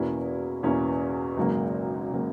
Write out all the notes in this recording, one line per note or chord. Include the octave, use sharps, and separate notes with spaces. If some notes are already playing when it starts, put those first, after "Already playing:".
Already playing: E2 B2 A#3 C#4 E4
E2 B2 A#3 C#4 E4
G#1 F#2 C#3 F#3 A#3
C#3 F#3 A#3